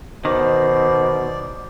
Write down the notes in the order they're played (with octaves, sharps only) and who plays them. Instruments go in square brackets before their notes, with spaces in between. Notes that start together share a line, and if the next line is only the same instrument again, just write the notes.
[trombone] B2 [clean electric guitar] D#3 [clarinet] C5 [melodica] D5